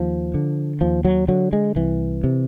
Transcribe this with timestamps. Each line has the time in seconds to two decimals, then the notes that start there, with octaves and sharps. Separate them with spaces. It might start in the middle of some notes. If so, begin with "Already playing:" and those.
Already playing: D#2 F3
0.34 D3
0.81 D#2 F3
1.05 F#3
1.28 D3 F#3
1.53 G#3
1.76 C2 E3
2.24 C3